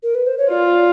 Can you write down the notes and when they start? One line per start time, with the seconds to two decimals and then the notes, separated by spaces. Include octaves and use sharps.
0.03 A#4
0.15 B4
0.26 C5
0.38 C#5
0.50 F4 D5